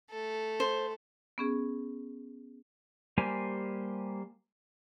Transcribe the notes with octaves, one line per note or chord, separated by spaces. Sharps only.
A3 A4
C5
B3 C#4 G#4
G3 A#3 G4 C5 G#5